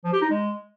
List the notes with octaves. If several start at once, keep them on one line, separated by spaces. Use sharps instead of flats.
F3
G4
D#4
G#3